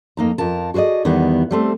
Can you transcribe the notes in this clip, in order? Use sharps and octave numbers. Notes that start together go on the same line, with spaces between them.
F2 A#3 D#4 A#5
F2 F4 A#4 A5
F#4 G#4 A#4 D5 D#5
E2 D#3 G3 B3 F#5
G3 A3 C4